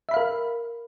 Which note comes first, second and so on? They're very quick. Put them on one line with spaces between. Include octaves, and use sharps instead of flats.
E5 B5 F5 A#4